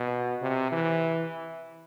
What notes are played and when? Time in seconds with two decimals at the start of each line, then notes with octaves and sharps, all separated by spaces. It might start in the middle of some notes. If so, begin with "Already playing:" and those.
Already playing: B2
0.42 C3
0.72 E3